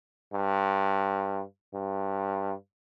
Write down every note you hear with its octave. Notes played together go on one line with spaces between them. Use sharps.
G2
G2